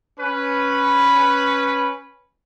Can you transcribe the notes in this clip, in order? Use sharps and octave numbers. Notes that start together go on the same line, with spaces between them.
C#4 B4